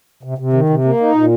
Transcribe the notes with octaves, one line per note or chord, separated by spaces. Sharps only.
C3
C3
D#3
C3
A#3
D#4
A#2